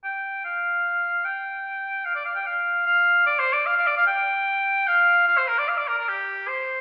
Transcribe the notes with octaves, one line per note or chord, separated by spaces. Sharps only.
G5
F5
G5
F5
D5
F5
G5
F5
F5
D5
C5
D5
F5
F5
D5
F5
G5
F5
F5
C5
A#4
D5
F5
D5
A#4
A#4
G4
C5